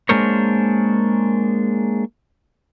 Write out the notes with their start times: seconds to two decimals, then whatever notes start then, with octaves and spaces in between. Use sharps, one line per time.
0.09 G#3 A#3 D4 A#4 C5 C#5